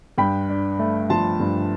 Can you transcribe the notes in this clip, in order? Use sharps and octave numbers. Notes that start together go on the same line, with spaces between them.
G2 G5 B5
D4
A3
F3 A5 C6
G2